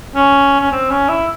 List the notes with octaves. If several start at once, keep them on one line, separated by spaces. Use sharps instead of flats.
C#4
C#4
C4
C#4
E4